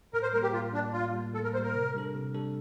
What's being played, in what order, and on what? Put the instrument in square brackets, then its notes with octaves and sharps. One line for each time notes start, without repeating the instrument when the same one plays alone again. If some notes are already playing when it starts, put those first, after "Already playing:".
[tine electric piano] A2 [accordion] A#4
[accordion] C5
[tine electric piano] G3 A#3 [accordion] A#4
[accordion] G4
[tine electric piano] A2 [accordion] F4
[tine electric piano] G3 A#3 [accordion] D4
[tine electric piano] A2 [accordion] F4
[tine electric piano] G3 A#3
[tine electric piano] A2 [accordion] A4
[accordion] A#4
[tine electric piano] A#3 [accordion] C5
[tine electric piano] G3
[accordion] A#4
[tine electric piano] C3
G3 D4 A4
C3
G3 D4 A4